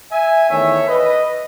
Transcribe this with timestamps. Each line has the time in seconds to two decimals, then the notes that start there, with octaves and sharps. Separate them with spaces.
0.12 E5 G#5
0.50 E2 D#3 A3 C#5 E5
0.88 B4 D#5